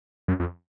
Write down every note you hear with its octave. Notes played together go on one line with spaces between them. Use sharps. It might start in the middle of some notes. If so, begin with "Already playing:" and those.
F#2
F2